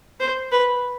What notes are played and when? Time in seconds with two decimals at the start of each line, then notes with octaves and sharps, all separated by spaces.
0.20 C5
0.52 B4